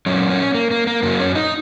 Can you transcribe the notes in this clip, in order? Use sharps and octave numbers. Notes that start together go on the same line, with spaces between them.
A#2 F#3 C#4
C#4
A#3
A#3
A#3
F#2 F#3 A#3
C#4
D#4